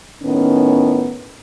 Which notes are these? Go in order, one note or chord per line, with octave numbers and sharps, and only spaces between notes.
A2 D#3 B3 C#4